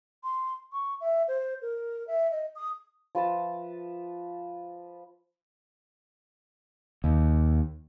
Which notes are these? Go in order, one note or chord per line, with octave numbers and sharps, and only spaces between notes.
C6
C#6
E5
C5
A#4
E5
D#5
D#6
F3 B4 E5 A5
D#2